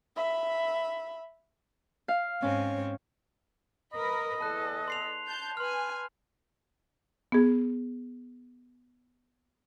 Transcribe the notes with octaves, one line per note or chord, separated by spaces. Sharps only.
E5 B5
F5
G#2 C4 C#4 C#5
A#4 B4 D#5 B5
E2 A4 A5 F#6
C6 C7 F7
A5 G6
B4 G#5 C6 F6
B3 G#4